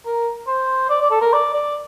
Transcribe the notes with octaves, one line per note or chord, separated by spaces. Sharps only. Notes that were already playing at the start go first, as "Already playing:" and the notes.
A#4
C5
D5
D5
A4
A#4
D5
D5